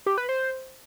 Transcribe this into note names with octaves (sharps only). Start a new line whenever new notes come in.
G4
B4
C5